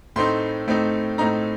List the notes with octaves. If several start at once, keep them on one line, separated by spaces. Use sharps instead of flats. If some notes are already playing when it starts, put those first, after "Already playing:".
A2 A3 C4 D#4 C6
A2 A3 C4 D#4
A2 A3 C4 D#4 A#5